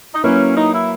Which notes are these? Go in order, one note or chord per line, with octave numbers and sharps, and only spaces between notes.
D#4
F#3 A#3 C#4 E4 B4
D#4
E4